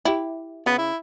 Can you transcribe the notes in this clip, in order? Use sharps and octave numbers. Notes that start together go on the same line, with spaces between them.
E4 G4
C#3 B3
E4